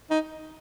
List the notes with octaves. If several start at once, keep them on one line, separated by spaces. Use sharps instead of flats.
D#4